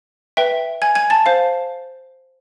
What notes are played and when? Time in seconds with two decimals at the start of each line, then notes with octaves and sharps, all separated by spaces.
0.37 B4 E5 G5
0.82 G#5 G#6
0.95 G#5 G#6
1.10 A5 A6
1.26 C5 F5